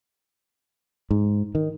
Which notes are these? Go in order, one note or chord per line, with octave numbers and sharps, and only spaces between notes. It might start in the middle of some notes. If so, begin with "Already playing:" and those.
G#2
D#3